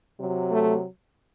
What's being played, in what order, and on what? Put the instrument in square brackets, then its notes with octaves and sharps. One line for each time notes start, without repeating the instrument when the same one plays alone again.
[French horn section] C3 F#3
A3